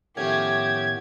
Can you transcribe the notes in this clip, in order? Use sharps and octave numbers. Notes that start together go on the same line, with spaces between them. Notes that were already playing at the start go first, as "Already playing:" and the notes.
A2 D#3 F3 A3 B3 C#4 G4 G#6